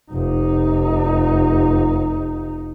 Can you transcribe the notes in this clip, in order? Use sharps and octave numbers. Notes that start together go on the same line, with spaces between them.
F1 D#4